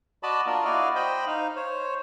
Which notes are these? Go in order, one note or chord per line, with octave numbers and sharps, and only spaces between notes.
F#4 D5 D#5 A5 B5
A#3 D4 F4 A#4
E4 F#4 D5 D#5 F5
C5 D#5 G5 B5
D#4 F5
C5 C#5